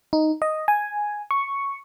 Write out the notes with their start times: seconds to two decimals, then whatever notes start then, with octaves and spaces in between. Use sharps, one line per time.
0.13 D#4
0.42 D#5
0.68 G#5
1.31 C#6